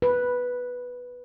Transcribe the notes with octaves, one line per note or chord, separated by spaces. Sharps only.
B4